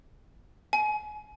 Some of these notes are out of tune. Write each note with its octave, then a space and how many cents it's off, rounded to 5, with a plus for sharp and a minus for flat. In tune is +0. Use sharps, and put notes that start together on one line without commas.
G#5 +30